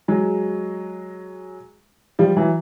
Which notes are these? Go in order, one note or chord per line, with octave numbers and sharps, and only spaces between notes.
F#3 G#3
F3 G3
E3 F#3